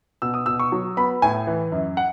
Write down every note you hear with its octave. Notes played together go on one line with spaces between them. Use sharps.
B2 E6
D#6
B2 E6
C#6
F#3
B3 B5
A2 G#5
E3
F#2
F#5